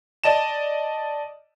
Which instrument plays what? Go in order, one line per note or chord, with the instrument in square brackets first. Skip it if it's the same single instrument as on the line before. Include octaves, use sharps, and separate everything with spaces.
[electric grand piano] D5 D#5 A5 E7